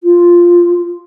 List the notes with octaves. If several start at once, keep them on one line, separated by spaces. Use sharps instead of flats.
F4